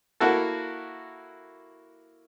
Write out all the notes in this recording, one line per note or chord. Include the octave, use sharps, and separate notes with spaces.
A#3 E4 F#4 A4